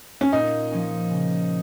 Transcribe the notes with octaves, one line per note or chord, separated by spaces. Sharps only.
C#4
A#2 D#4
F3 C#4
C#3